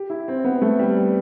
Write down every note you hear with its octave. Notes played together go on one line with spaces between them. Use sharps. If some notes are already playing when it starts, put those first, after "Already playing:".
Already playing: G4
E4
C4
B3
A3
G3
G3